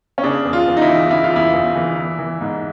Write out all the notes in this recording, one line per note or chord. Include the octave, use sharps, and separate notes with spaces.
C#4
C#3 D4
E2
F4
E2
D#4
E4
E3
C#3 E4
F4
E2 E4
E2
E3
E3
E3
G#2